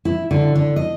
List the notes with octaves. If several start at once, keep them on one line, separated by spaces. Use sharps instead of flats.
E4
D3
D3
D#5